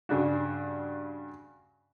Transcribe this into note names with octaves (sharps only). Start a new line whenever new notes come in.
G2 C#3 D4 F#4